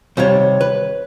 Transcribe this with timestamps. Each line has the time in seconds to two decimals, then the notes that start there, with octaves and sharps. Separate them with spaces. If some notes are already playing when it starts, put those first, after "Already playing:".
0.17 D#2 C3 G3 C5 C#5
0.61 B4